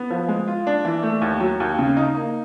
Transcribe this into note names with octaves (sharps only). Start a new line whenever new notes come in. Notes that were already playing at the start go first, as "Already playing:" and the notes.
Already playing: B3
F3
G#3
F4
D4
E3
A3
D#2
F#3
D#2
C#3
D#4
A#3